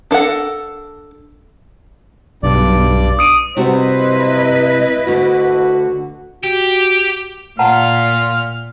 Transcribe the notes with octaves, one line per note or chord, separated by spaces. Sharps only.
D4 A4 A#4 F#5
B1 G2 D5
D#6 D7 D#7
C3 G3 E4 F#4 B4 C5 D#5
D2 D3 F#4
F#4 G4
A#2 F4 F#5 A5 A#5 F6